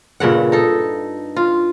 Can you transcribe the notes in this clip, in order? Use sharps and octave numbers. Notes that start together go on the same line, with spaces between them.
G2 A#2 C#3 F#5
D#4 A4
F4